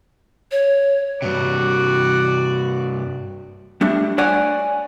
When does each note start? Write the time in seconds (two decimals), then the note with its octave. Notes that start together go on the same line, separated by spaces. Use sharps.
0.52 C#5
1.22 G2 C3 F#4 D5
3.81 G3 A3 D4
4.18 C#5 D5 F#5 G#5